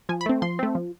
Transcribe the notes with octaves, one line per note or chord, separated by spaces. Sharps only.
F3 G#5
B5
A3 C4
F3 C6
A3 C4
F3